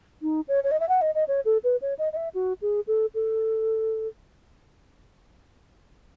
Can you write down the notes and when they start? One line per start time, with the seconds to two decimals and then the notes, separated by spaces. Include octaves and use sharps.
0.22 D#4
0.48 C#5
0.64 C#5
0.71 D#5
0.80 E5
0.89 F#5
1.02 D#5
1.15 D#5
1.28 C#5
1.45 A4
1.64 B4
1.82 C#5
1.99 D#5
2.13 D#5
2.16 E5
2.35 F#4
2.62 G#4
2.87 A4
3.15 A4